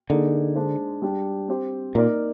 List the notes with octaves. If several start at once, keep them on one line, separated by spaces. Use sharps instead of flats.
D3 A#3 D#4 G#4
G#3 D4 G#4 C5
G3 D4 G4
C4 G4 C5
A#2 A#3 D#4 A#4 D5